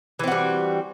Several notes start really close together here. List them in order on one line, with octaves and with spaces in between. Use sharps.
E3 C4 F#4 G3